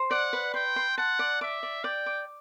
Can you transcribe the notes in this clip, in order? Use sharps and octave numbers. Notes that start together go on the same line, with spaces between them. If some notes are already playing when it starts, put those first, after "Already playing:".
Already playing: C5
D5 F#5
B4
G5 C6
C6
F#5 A5
D5
E5 D6
D5
D5 G5
D6